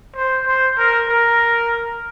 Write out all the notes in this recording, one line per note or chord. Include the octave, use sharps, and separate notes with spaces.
C5
C5
A#4
A#4